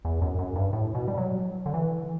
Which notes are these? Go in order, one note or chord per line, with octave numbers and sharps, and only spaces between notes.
E2
F#2
F#2
G2
A2
B2
G3
F#3
D3
E3